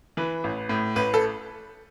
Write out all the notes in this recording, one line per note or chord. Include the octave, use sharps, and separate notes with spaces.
E3 B4
A1
A2
A1 B4
A4